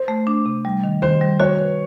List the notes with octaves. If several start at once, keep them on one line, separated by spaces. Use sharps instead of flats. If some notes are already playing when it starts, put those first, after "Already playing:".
Already playing: C5
A3
D4
C3
G3
D#3
D#3 C5
G3
F#4 C#5
B4